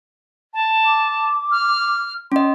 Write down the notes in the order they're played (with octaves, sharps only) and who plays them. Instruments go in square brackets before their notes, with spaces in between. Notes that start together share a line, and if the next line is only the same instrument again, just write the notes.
[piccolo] A5
[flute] D6
[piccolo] F6
[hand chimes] C#4 D#5 [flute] C6